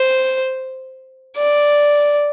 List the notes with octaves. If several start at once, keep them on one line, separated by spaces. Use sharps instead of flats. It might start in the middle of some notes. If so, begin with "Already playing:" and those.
Already playing: C5
D5